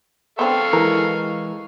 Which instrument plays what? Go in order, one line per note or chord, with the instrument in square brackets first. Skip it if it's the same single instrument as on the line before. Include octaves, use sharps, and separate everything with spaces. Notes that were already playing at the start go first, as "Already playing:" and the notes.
[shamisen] B3 C4 D4 [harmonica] A4 F5 C#6
[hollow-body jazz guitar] E3 G#3 [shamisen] A#4